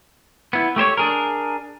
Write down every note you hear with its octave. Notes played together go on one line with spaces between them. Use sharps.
B3 E4
A3 G4 C5 C#5
D4 G#4 A#4